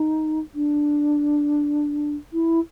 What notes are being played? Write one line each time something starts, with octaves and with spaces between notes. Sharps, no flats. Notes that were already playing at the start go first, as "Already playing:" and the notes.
Already playing: D#4
D4
E4